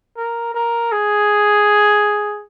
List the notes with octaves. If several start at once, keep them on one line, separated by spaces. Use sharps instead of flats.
A#4
A#4
G#4